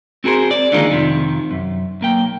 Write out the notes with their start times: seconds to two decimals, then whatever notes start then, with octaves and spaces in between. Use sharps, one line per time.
0.24 C4 F#4 G#4 A#4 C5
0.51 D5
0.72 D3 D#3 F3 G#3 A#3 D#4
0.91 F2 C3 D#3
1.51 F#2
2.01 B1 A#3 G5